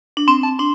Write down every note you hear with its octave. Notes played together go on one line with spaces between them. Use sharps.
D4
C4 C6
A5
D4 C6